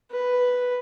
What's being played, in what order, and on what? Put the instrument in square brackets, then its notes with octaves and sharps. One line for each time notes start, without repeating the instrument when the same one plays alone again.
[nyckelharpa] B4